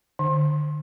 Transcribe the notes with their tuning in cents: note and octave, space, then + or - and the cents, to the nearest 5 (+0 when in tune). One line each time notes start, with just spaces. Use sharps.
D3 +25